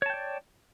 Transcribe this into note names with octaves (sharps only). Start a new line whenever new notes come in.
C#5 D5 G5 A5